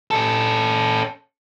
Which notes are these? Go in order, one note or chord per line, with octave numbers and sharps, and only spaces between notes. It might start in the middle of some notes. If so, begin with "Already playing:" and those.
C#4 A4